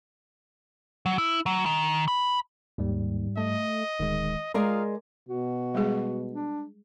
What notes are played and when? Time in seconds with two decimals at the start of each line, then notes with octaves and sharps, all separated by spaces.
1.06 F#3
1.18 E4
1.46 F#3
1.66 D#3
2.08 B5
2.78 D#2 G#2 G3
3.37 A3 D#5
3.99 D1 D#3 G#3
4.54 G#3 F4 A#4 D5 F5 A#5 D#6
5.29 B2 F#4
5.74 G3 G#3 G#4
6.33 D4